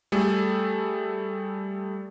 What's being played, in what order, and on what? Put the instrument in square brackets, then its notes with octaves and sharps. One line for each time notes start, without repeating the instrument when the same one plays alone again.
[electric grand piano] G3 A3 G#4 A4